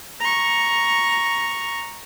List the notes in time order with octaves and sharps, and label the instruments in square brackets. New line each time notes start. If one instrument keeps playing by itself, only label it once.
[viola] A#5 C#6